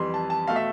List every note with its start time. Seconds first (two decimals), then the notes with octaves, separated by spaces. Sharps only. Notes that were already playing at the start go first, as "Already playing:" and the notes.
Already playing: F2 E3 G3 C6
0.14 A5
0.30 A5
0.47 B2 A3 F5
0.56 E5